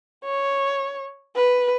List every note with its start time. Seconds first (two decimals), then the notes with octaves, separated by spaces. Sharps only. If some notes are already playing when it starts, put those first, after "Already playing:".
0.24 C#5
1.36 B4